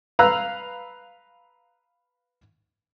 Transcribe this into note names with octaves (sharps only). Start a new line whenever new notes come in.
B4 F5 A#5 E6 F#6